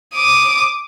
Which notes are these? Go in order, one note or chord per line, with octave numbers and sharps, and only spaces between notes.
D6 D#6